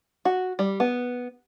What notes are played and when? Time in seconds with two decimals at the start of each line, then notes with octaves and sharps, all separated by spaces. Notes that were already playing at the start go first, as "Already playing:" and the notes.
0.25 F#4
0.59 G3
0.80 B3